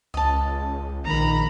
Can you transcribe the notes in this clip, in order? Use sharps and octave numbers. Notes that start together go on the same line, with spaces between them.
C#2 D#5 A5
A#1 D#3 A#5 B5